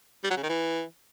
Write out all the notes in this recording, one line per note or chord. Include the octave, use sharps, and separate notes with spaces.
G3
F#3
C#3
D#3
E3